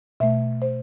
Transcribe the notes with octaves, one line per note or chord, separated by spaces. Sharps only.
B2 A3 E5
C5